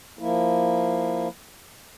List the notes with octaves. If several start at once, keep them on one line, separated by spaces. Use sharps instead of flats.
F3 A#3 E4